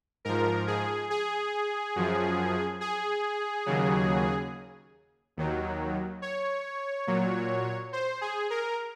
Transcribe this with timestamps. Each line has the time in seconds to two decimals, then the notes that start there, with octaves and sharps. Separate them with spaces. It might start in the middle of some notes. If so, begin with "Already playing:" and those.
0.25 G#2 F3 A#4
0.67 G#4
1.10 G#4
1.96 F#2 F3
2.81 G#4
3.66 D#2 C#3 F#3
5.37 D#2 D#3 F#3
6.22 C#5
7.07 A#2 F#3
7.93 C5
8.21 G#4
8.50 A#4